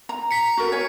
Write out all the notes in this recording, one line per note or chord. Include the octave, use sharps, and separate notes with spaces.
A#5
B6 C#7
F#4 A4 A#4
C#5 G#5